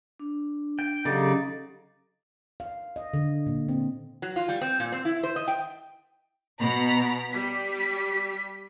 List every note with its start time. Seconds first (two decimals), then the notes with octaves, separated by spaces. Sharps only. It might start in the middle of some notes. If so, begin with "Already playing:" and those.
0.19 D4
0.79 G5
1.05 C#3 F#3 D#4 G4 A4 D5
2.60 F5
2.96 D#5
3.14 D3
3.46 A#2
3.69 C4
4.22 F#3
4.36 F4
4.49 G3
4.61 C4
4.80 A#2
4.92 C4
5.05 E4
5.23 C5
5.36 D#5
5.48 G5
6.61 B2 A#5 B5
7.32 G3 B6